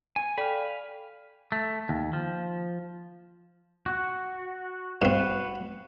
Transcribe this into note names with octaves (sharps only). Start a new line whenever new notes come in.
G#5
A4 D5 F5 G5 B5
A3
D#2
F3
F#4
G2 C4 F#4 B4